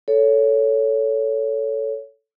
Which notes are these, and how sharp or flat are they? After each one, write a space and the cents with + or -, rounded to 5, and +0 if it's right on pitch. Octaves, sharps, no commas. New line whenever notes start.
A4 +0 C#5 +15